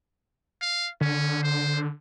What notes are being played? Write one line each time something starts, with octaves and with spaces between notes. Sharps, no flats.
F5
D3 C#4
C5